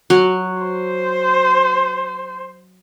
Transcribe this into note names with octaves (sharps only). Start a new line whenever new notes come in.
F#3
C5